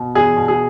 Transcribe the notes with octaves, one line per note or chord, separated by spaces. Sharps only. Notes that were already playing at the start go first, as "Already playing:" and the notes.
Already playing: B2
E2 G#4
B2
G#4